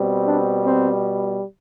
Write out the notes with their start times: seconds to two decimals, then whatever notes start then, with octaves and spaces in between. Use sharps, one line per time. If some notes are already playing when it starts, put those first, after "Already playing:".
Already playing: B2 G3 C4
0.25 D4
0.64 C4